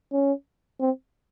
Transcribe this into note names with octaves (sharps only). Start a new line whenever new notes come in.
C#4
C4